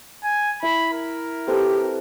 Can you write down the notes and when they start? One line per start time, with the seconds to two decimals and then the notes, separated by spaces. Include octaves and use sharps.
0.24 G#5
0.63 E4 E5 B5
0.94 A#4
1.48 C4 G4 A4 B4